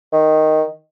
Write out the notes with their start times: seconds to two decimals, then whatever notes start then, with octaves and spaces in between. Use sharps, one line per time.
0.12 D#3